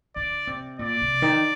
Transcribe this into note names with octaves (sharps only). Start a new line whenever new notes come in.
D3 D5
C3
A#2 D5
C3
D#3